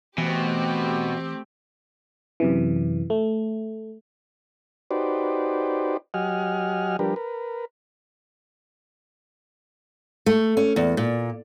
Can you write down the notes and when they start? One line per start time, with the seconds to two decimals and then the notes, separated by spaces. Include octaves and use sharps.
0.18 B2 E3 A3 C4 G4
2.40 F#2 C3 E3
3.10 A3
4.91 D#4 F#4 G4 B4 C5 D5
6.14 F#3 G4 D#5 F#5 G#5 F6
6.99 F3 G3 D4 G4 A#4 B4
7.16 A#4 B4
10.26 A3
10.57 C#4
10.76 E2
10.97 A#2